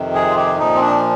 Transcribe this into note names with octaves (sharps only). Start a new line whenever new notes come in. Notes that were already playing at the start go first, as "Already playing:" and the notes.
Already playing: F2 C3 D#3
G#4
F4
G4
A#2 F3 D#4
C4
D4